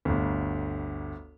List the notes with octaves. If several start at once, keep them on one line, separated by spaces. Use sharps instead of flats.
G1 D2